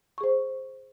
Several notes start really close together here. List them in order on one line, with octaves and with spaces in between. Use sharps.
C#6 G#4 C5